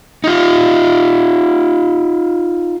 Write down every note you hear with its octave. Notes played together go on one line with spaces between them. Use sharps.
D#4 F4